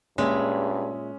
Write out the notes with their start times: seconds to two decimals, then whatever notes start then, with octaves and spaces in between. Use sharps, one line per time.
0.18 G2 A#2 G#3 C#4 E5